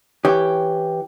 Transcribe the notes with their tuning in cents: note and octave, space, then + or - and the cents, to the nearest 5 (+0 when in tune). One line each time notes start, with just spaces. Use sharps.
E3 +0 G4 +0 C#5 +0